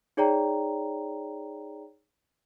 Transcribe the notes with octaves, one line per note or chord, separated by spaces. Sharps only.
D#4 G#4 C#5 D5 G5 A#5